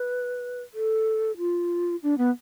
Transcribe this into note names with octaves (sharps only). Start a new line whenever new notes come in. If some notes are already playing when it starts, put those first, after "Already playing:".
Already playing: B4
A4
F4
D4
B3